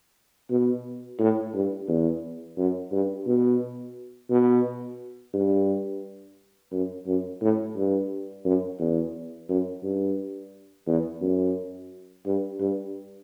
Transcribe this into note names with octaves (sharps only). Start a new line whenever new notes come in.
B2
A2
G2
E2
F#2
G2
B2
B2
G2
F#2
F#2
A2
G2
F#2
E2
F#2
G2
E2
F#2
G2
G2